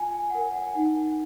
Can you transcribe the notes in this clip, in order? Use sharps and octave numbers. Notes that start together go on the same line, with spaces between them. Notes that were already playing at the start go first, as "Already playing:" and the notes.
Already playing: F4 G#5
G#5
F#5
A#4 C#5 G#5
F#5
G#5
D#4 F#5